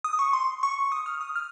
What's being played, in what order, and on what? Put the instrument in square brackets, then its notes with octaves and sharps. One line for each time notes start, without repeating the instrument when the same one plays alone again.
[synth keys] D#6
C#6
C6
C#6
D#6
F6
D#6
F6